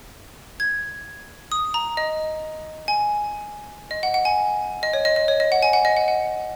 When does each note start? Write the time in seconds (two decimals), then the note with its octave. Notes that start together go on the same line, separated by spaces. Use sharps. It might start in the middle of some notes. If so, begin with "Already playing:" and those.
0.60 G#6
1.52 D#6
1.74 A#5
1.97 D#5
2.88 G#5
3.91 D#5
4.03 F#5
4.14 F#5
4.25 G#5
4.83 D#5
4.93 C#5
5.05 D#5
5.16 D#5
5.28 C#5
5.40 D#5
5.52 F#5
5.63 G#5
5.73 F#5
5.85 D#5
5.97 F#5
6.08 F#5